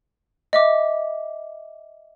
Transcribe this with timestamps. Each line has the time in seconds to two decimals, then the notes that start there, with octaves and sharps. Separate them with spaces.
0.53 D#5 E5 D6